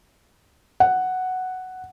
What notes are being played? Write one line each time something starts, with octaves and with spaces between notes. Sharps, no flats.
F#5